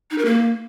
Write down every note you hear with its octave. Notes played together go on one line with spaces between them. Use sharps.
D#4
A#4
A#3